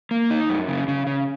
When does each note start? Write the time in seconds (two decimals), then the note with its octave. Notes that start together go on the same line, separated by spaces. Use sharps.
0.11 A#3
0.30 D#4
0.49 F#2
0.68 C#3
0.88 C#3
1.07 C#3